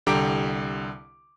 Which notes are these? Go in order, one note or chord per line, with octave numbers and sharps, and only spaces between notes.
C2 D3 G4 A#5 D6 D7